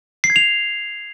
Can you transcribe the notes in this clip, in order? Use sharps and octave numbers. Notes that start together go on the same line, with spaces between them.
C7
G#6
F7